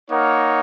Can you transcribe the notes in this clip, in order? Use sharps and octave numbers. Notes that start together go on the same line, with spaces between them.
A#3 D#4 A#4 C#5 F#5